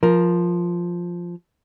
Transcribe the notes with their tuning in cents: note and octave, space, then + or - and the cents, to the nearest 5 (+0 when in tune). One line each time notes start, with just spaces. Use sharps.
F3 +0 A#4 +15